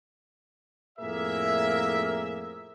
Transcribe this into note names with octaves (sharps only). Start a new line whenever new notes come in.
F2 A2 A#3 G#4 A#4 E5